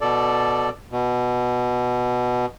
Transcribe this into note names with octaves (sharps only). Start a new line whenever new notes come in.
B2 A4 D5
B2